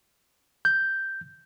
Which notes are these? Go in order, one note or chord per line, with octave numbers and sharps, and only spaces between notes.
G6